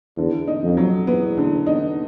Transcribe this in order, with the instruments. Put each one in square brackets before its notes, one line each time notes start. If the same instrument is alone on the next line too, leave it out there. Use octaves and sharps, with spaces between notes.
[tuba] E2 [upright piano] D3
[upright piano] D#4
[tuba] F2
[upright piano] F#3
[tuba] E2 [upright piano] B3
[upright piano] D3
D#4